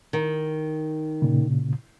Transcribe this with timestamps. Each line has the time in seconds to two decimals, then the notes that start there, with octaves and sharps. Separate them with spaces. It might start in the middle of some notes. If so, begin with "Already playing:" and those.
0.13 D#3
1.22 A#2 C#3